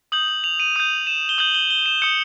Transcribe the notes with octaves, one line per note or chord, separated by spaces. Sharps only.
D#6 G6 F#7
F#7
F7
D#7
D#6 G6 D#7
E7
G7
D#6 G6 F#7
G7
G7
E7
D#6 G6 C#7